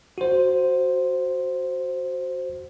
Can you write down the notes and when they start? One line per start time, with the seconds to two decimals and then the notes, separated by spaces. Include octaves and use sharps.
0.18 F#4 C5